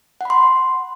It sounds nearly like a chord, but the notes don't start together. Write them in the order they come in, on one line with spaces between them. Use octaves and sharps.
F#5 B5 C6